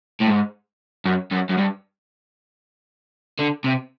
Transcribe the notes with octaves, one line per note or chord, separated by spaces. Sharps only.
A2
G#2
F#2
F#2
F#2
G2
D3
C3